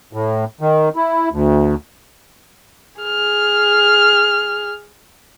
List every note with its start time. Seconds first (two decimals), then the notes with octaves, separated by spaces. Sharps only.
0.13 A2
0.61 D#3
0.96 E4
1.31 D2
3.02 G#4 F6